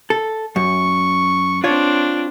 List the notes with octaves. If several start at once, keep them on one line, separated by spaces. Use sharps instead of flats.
A4
F#2 C#6
C4 D4 F4 C#5